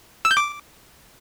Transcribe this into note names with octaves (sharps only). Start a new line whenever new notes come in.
E6
G6
D6